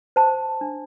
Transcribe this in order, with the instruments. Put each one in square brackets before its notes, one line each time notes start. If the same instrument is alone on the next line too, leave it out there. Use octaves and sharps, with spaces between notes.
[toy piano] C5 A5
D4